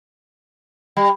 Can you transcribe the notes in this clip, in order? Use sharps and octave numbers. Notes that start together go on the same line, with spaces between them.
G3